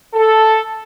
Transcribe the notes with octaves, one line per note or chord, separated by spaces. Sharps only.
A4